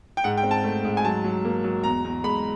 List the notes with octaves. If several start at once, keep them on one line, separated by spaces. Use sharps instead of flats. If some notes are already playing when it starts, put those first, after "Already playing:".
G5
G#2 F#5
G5
C4
A5
A3
G#2
G#5
F#3 A5
F#3
A#3
F#3
E2 A#5
E2
G#3 B5